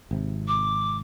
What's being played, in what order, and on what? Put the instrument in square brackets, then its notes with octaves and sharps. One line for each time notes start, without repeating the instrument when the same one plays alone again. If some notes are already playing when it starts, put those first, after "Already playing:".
[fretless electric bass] G#1 C3
[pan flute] D6